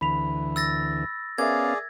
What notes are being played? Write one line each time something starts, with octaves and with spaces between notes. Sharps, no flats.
D2 E3 B5 B6 F7
E6 A6 A#6
B3 C#4 G#4 A#4 D5 E5 F5 G#6